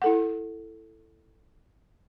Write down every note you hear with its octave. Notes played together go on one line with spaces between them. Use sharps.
E4 A4 F#5